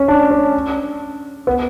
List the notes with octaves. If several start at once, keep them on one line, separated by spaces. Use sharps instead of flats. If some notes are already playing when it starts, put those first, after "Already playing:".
Already playing: C#4
D4
C#4
B3